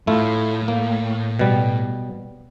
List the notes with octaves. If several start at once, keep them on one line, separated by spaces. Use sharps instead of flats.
A2 A3 E4 F4
A#3
B2 G3